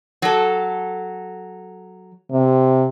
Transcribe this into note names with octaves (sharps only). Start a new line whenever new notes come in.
F#3 A4
C3